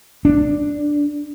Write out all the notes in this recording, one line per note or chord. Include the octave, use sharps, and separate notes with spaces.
D4